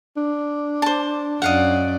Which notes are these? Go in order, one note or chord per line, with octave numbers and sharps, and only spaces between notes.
D4
C5 A5
F#2 D5 D#5 F5 F#5